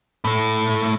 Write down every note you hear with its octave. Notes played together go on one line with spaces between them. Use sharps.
A2 A3